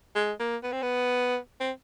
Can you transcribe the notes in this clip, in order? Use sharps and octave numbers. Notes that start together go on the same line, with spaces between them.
G#3
A#3
B3
C4
B3
C4